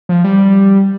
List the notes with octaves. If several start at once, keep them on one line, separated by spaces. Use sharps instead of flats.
F3
G3